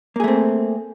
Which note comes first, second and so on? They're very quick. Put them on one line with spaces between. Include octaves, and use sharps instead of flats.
A#3 G#4 A3 C4